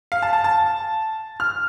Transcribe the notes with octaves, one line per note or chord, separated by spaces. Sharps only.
F5
A5
A5
A5
F6